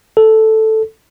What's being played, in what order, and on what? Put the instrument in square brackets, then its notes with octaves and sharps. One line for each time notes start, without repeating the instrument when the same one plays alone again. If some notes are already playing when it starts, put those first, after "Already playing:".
[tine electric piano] A4